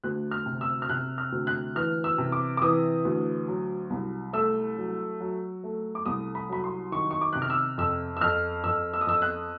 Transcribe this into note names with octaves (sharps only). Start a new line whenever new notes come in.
D2 F#6
F6
C3
E6
F6
C3 F#6
F6
D2
F#6
E3 F6
E6
C3
D6
D6
E3 D#6
D2
F#3
C2
A3 E6
F#3
F#3
A3
D6
C2 D#6
B5
F#3 B5
C6
D#3 C#6
C#6
D6
C3 F#6
F6
E6
F2 E6
E6
F2 F6
F2 E6
E6
D#6
F2 E6
F#6